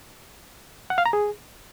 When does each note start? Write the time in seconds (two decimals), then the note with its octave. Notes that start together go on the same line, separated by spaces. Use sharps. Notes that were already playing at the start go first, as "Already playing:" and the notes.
0.90 F#5
0.98 F5
1.06 A#5
1.13 G#4